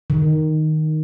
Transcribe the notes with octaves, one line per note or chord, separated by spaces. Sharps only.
D#3